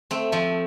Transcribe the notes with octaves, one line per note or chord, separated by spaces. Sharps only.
A3 C4
F3 A3